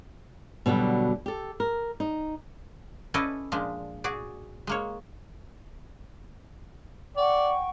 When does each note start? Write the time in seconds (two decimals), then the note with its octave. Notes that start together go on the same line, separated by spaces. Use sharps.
0.66 B2 D3 F#3 G3
1.26 G4 A4
1.60 A#4
2.00 D#4
3.14 C#4 E4 A4 B4 D5 D#5
3.52 A#2 F3 G#3 D4
4.04 F#4 G#4 D5
4.67 G#3 A#3 C#5
7.17 D5 F#5 G5 C#6